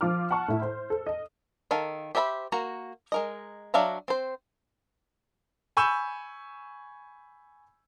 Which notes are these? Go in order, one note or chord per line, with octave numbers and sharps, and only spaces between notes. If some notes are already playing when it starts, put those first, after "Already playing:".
F3 F4 D6 F6
F#5 A5 C#6 F6
A2 E4
C5
A4
D#5
D#3 A4 F5
G4 C5 E5 A#5 B5
A#3 F#4 A#5
G#3 A#4 D#5
F#3 D4 E5 F5 A#5
C4 C5
G#5 B5 C#6 E6 G6 E7